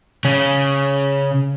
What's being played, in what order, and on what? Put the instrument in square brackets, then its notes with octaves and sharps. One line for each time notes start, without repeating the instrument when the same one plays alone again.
[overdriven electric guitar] C#3 C#4